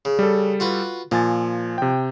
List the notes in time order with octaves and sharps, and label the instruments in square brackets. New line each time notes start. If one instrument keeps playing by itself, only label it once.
[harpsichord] C#3
[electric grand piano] G3 A4
[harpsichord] F4 F#4 B4
[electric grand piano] A#2 G#5 A6 [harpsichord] F3
[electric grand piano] C3 G5